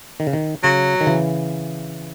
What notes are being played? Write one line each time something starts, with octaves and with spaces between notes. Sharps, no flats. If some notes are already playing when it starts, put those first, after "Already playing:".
D#3
C#3
D#3
C#3 F#3
D#3
C#3 E3